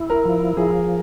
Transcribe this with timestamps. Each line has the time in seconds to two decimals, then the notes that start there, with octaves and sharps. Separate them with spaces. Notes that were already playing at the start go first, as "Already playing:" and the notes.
Already playing: E4
0.10 A#4
0.25 F3
0.57 F3 G#4